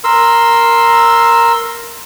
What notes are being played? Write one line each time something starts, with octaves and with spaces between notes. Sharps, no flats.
A#4 C6 E6